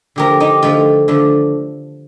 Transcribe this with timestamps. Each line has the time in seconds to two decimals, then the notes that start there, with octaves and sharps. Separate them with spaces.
0.16 D3 F3 A3 G4 A#4
0.40 D#4 G4
0.62 D3 F3 A3 F4
1.08 D3 F3 A3